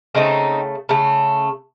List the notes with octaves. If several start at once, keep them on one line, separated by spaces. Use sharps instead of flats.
C#3 A3 C4 D#4
C#3 A3